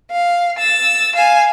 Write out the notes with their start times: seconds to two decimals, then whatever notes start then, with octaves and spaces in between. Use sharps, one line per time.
0.11 F5
0.58 E6 A6
1.16 F5 G#5